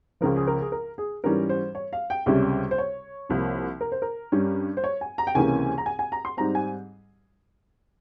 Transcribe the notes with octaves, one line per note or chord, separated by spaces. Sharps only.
C#2 C#3 F3 A#4
G#4
A#4
G#4
A#4
G#4
G#2 E3 G3 C#4 A#4
C5
C#5
F5
G5
C#2 C3 G3 C#4 E5
C5
C#5
C2 C3 F3 A#3
A#4
C5
A#4
G2 G3 C#4
C5
C#5
G#5
A#5
G5
C#2 C3 E3 A#3 C#4 G#5
A#5
G#5
G#5
A#5
C6
G#2 G3 C4 A#5
G#5